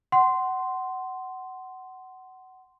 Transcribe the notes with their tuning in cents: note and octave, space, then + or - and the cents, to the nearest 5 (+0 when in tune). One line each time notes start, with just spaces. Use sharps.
F#5 +20 C6 -5